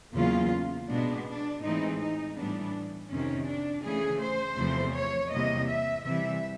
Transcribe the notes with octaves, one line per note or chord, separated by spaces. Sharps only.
E2 C#3 F#3 A#3 C#4 F4
B2 G#3 B3 D4
D4
A2 E3 G#3 C4 D#4
D#4
A2 E3 G3 B3 D4
F2 C3 D#3 C#4
D4
C#3 E3 A3 G#4
C5
E2 C3 F3 A3
C#5
E2 C3 E3 G3 A#3 D#5
E5
C3 E3 G3 E5